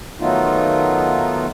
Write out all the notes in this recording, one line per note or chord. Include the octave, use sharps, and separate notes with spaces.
D#3 F#3 A3 B3 D#4 F4